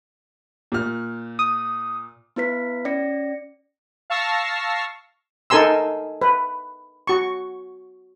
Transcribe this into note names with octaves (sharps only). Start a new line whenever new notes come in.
A#2 F6
D#6
B3 E4 B4 B6
C#4 D5 A#6 C#7
F5 A5 C#6 E6 A#6 C7
D#4 A4 A#4 G#5 C6 E6
B4
F#4 C#6